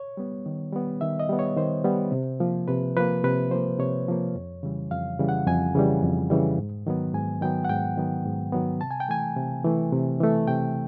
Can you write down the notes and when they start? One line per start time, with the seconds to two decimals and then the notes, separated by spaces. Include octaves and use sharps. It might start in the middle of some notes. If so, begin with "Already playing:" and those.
Already playing: C#5
0.17 G3 B3
0.46 D#3
0.73 G3 B3
1.01 D#3 E5
1.20 D#5
1.29 G3 B3
1.39 C#5
1.56 D#3 C5
1.85 G3 B3
2.12 C3
2.40 F3 A#3
2.68 C3 B4
2.97 F3 A#3 B4
3.24 C3 B4
3.51 F3 A#3 C5
3.79 C3 C#5
4.08 F3 A#3
4.35 F2
4.63 C#3 E3 G3
4.91 F2 F5
5.19 C#3 E3 G3
5.29 F#5
5.47 F2 G#5
5.75 C#3 E3 G3
6.03 F2
6.30 C#3 E3 G3
6.58 G#2
6.87 D#3 F#3 B3
7.13 G#2 G#5
7.41 D#3 F#3 B3 G5
7.65 F#5
7.69 G#2 G5
7.97 D#3 F#3 B3
8.25 G#2
8.52 D#3 F#3 B3
8.81 C3 A5
8.91 G#5
9.00 G5
9.09 E3 A3 G#5
9.36 C3
9.65 E3 A3
9.92 C3
10.20 E3 A3
10.48 C3 G5